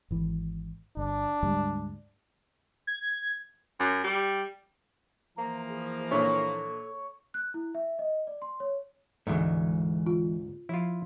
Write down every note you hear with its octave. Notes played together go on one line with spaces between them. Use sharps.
G#1 E3
G1 D4
D2 G#2 G3
G#6
F#2
G3
E3 F3 A#3 A#5
G#4
A#2 D4 E4 A4 C#5
F#6
E4
E5
D#5
D5
C6
C#5
D2 G#2 E3 G#3 A3
F4
F3 E4 F4